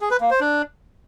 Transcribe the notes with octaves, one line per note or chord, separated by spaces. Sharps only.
G#4
B4
A#3
C5
D4